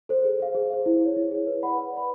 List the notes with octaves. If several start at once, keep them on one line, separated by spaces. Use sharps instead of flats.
A4 C5
G#4
C5 F5
G#4
C5 F5
E4
G#4 C#5
E4
G#4 C#5
B4
D5 F#5 B5
B4
D5 F#5 B5